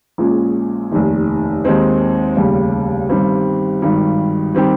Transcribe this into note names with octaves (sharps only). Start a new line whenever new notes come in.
A#1 A#2 G#3 C#4
F1 D#2 D#3
D#2 D#3 G#3 C4 D#4
F1 D#2 C#3 G3
G1 G2 D#3 G3 C4
G#1 G2 D#3 G3
D#3 G3 C4 G4